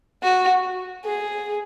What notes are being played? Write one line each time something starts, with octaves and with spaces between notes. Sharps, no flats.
F#4
G#4